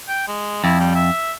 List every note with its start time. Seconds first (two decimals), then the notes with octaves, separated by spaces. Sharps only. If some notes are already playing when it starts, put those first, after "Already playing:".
0.08 G5
0.28 G#3
0.64 F2 E4
0.80 G3
0.95 E5